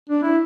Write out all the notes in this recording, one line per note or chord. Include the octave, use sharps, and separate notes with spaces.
D4
E4